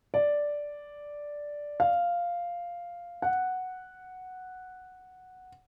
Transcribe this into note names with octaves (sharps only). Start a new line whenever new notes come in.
D5
F5
F#5